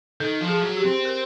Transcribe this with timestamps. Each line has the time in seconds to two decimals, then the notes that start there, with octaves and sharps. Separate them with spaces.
0.20 D#3 A4
0.41 F3
0.48 G#4
0.62 F#3
0.77 G4
0.85 C4
1.05 A#4